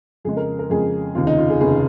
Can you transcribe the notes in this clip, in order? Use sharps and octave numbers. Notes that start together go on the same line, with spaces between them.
F2 C#3 G#3 G#4
A#4
A#4
F2 C#3 G#3 G#4
F1 D#2 C#3 F4
D#4
F4
G#4
F1 D#2 C#3 G#4